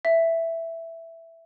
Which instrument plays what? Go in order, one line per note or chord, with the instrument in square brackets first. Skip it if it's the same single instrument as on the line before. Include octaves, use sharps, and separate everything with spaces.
[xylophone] E5